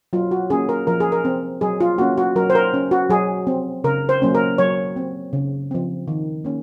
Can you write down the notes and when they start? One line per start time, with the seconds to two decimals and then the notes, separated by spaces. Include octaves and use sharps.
0.13 F#3 F4
0.31 F#4
0.50 A#3 C#4 G#4
0.69 A#4
0.87 F3 A#4
1.00 G#4
1.12 A#4
1.25 C4
1.61 F#3 G#4
1.80 F4
1.98 A#3 C#4 F#4
2.18 F#4
2.36 F#3 A#4
2.50 C5
2.55 A#4
2.74 C#4
2.91 F#4
3.10 F#3 G#4
3.47 C4
3.84 C#3 A#4
4.09 C5
4.22 F#3 A#3 C#4
4.35 A#4
4.58 F#3 C#5
4.96 C4
5.33 C#3
5.71 F3 C4
6.08 D#3
6.45 A#3 C#4